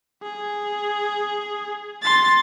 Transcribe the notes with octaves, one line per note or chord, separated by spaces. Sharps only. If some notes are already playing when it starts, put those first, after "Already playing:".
G#4
C6 A6